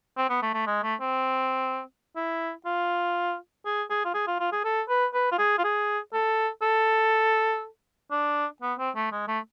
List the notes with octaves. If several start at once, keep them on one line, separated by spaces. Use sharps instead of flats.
C4
B3
A3
A3
G#3
A3
C4
E4
F4
G#4
G#4
F4
G#4
F4
F4
G#4
A4
B4
B4
F4
G#4
F4
G#4
A4
A4
D4
B3
C4
A3
G#3
A3